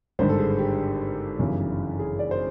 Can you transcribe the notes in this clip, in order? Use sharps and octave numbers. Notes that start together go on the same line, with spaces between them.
G#1 G2 D3 C5
A4
G#4
G4
G1 F#2 C#3 E3
G#4
D5
C5